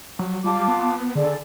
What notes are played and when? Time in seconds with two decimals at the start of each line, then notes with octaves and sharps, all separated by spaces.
0.19 F#3
0.44 G3 F4 A5 D6
0.68 B3
1.15 D3 G#4 A4 D5